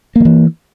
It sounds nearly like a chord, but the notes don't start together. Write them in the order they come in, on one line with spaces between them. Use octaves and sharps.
A#3 F3 E3